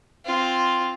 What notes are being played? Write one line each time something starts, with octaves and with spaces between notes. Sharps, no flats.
C4 F4